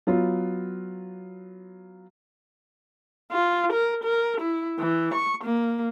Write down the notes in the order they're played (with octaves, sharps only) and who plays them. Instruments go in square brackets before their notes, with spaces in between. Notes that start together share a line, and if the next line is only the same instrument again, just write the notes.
[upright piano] F#3 B3 F4
[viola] F4
A#4
A#4
E4
E3
C#6
A#3